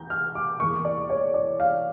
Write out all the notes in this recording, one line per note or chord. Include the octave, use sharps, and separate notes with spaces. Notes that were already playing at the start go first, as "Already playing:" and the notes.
Already playing: E2 A#5 G6
F6
D6
E2 E3 A#3 C#6
D5
C#5
D5
F5